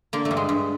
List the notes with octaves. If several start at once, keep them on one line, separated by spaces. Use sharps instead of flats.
D3 A#3
A3
G2
G#3
G2